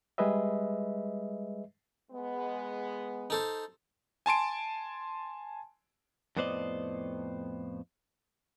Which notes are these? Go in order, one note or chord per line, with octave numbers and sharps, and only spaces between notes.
G3 G#3 G#4 B4 D#5 E5
G#3 B3
D#4 A4 C5
G#5 A5 C6 D7
F2 A2 B3 C5 D5 D#5